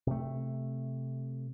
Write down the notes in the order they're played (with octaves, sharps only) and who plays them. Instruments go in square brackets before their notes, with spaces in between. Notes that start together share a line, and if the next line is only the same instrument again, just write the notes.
[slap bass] C3 A3